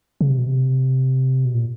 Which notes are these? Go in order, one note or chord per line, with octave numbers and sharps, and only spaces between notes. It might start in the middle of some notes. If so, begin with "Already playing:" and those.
C#3
C3
B2
C3
B2
A#2